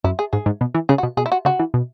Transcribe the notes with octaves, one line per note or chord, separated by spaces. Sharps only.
F#2 E4
G#4
G#2 G#4
G#2
B2
E3
C#3 G#4
F#4
B2
B2 G#4
E4
F#4
C#3 F#4
E3
B2